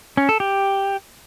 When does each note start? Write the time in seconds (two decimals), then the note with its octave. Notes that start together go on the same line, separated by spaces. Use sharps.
0.17 C#4
0.29 A4
0.40 G4